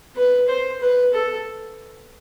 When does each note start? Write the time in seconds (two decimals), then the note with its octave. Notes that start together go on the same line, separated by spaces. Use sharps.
0.16 B4
0.48 C5
0.81 B4
1.13 A4